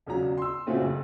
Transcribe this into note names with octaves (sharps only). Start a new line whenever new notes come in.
E1 C#2 F#3 A#5
C6 E6
A#2 C#3 A3 C4 F#4 A4
F#1